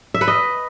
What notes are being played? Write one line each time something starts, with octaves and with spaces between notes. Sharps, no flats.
E5
B4
D#5